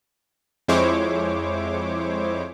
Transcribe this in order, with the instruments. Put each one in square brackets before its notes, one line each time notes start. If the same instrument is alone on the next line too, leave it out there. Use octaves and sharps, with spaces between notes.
[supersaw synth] F2 G#3 E4 C5 C#5 D6